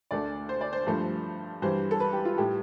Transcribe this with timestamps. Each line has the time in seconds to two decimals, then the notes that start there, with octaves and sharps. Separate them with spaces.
0.11 D2 D3 A3 D5
0.49 C5
0.61 D5
0.73 C5
0.86 G2 F3 A3
1.62 G2 E3 G3 C5
1.91 A4
2.00 B4
2.13 G4
2.25 F4
2.38 A2 G3 G4